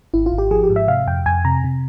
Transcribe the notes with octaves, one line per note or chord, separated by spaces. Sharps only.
G#1 E4
F4
G#1
G4
F3 G#4
G4
G#2
E5
C3 F5
F2 G5
F2 G#5
C3 A#5
C3